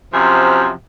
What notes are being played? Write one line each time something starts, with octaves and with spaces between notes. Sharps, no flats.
F#2 C3 F3